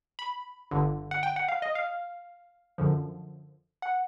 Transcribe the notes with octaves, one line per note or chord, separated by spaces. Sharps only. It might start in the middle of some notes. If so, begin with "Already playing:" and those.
B5
G1 G2 D3
F#5
G5
F#5
F5
D#5
F5
F#2 D3 F3
F#5